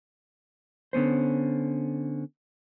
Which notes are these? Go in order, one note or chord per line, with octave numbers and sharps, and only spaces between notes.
D3 B3 C#4 C5